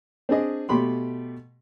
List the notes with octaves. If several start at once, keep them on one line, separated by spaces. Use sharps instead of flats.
C4 D4 G#4 D#5
B2 A3 G4 B5 C6